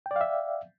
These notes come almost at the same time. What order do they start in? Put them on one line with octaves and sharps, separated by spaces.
G5 D5 F5 E5